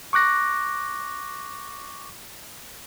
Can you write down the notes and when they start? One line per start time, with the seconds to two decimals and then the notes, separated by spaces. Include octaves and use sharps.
0.13 C#6 D6 F#6 A#6